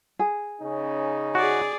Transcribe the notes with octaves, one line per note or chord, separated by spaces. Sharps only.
G#4
C#3 C#4 D#4
F#4 G#4 D5